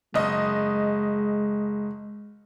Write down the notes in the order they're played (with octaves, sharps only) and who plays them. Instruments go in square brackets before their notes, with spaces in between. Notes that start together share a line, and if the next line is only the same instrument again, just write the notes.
[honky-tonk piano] F#1 D#5 [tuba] G#3